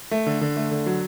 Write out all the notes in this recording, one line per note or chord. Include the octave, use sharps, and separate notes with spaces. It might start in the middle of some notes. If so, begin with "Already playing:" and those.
A3
D3
D3
A3
D3
F#3